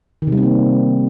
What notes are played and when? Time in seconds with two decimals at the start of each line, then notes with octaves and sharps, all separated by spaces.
0.22 D#3
0.27 C3
0.32 G3
0.37 C4
0.43 A#3